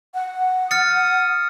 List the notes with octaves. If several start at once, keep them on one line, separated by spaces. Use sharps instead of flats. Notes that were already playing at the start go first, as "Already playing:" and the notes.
F#5
D#6 F6 A6 C#7